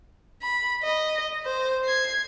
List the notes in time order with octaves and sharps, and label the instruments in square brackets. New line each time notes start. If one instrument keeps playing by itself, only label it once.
[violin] B5
D#5
C5
G#6 C7